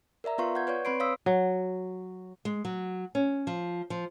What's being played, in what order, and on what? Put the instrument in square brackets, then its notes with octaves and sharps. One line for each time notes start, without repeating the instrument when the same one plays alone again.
[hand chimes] A#4 D5 E5 A#5
B3 F4 B4 F5 C6 C#6
F#5 G6 G#6
B4 C#5 D5 C#6
C4 B4 B5 C6 C7 D7
C#5 F5 C6 D#6 E6 B6
[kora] F#3
[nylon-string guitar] G#3
F#3
C#4
F3
F3